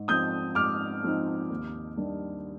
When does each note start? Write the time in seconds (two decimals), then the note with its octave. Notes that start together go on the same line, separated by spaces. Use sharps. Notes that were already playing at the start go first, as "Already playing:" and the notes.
Already playing: G#2
0.08 F3 C4 D#4 D#6 G6
0.55 G#2 D6 F6
1.03 F3 C4 D#4
1.50 D#2
1.97 D#3 G3 D4